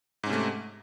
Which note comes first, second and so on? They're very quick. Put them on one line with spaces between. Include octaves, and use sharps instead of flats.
G#2 C#4 C3 A3